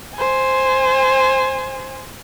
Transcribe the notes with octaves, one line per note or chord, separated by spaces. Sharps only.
C5 G#5